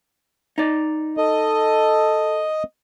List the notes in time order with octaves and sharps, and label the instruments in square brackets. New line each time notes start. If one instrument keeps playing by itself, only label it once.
[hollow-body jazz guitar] D#4 D5
[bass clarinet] A4 [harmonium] D#5